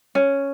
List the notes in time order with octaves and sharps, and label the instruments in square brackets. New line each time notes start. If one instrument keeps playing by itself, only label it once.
[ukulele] C#4